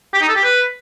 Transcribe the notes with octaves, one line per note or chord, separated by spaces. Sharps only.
G4
D#4
A4
G4
B4